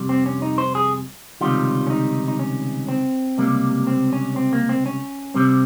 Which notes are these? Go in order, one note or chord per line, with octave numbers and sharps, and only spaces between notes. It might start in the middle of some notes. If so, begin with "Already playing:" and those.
Already playing: F2 C3 G3
C4
C#4
D#4
C5
G#4
C#2 C3 D#3 G3 F4
C#4
D#4
D#4
C#4
C4
C#2 C3 G3 A#3
C4
C#4
C4
A#3
C4
C#4
C2 C3 G3 C4